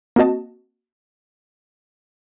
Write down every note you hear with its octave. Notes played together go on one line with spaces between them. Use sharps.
A#3 C4 F#4 D#5 A5